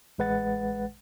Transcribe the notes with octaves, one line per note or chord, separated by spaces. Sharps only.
A1 G#3 B4 F#5 A6